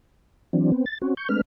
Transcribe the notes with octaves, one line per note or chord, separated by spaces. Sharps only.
E3 F#3 C4 D4
B3 C4
A6
C4 C#4 F#4
C#6 G6
G#3 A3 C4 D4 B4 F6